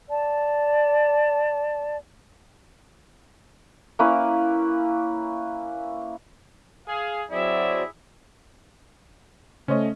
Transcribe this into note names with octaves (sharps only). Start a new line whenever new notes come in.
D5 A5
A#3 C#4 E4 B4
G#4 F5
F#3 C4 E4 G#4 D5 E5
C#3 A3 C#4 C5 C#5 D#5